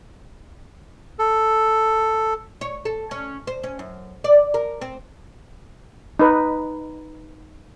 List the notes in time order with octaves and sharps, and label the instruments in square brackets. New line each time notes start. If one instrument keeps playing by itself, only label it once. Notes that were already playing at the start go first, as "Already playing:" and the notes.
[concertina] A4
[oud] C#5
A4
C#4
C5
C#4
F#2
D5
A#4
C4
[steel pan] D#4 B4